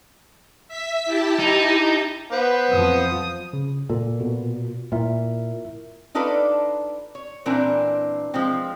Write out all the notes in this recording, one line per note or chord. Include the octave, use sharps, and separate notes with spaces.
E5 B6
E4 G4 A5
D#4
B3 B4 C5
F2 F3 D#6
C#3
A#2 A4
B2
A#2 E4 A#4 E5
D4 D#4 F4 A4 B4 D5
C#5
A#2 E3 C4 D4 A#4
F3 G#3 C4